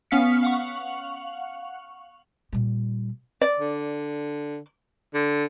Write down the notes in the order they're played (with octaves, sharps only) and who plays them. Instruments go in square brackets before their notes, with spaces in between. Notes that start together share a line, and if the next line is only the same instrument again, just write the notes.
[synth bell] B3 C#4 F5 F6 B6 C#7
F5 F#5 C#6
[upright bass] A#2 G3
[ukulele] D5
[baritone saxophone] D3
D3